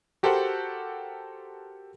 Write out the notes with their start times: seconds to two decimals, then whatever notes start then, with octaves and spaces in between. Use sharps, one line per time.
0.23 F#4 G4 A4 A#4 C5 F#5